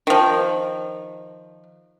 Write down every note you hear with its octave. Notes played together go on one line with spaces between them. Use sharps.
D#3 F3